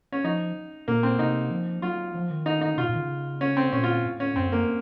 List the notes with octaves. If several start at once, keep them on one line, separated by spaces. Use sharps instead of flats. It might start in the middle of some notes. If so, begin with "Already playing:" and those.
C#4
F3 D#4
A#2 A#3
C4
C3 D#4
F3
F#3 F4
F3
D#3
D#4
D#4
C3 F4
A2
A#2
D#3
C#3
C#4
C4
A#2 C#4
F4
A2
C#4
F#2 C4
A#3